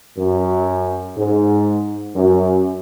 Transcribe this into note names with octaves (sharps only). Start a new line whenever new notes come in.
F#2
G#2
F#2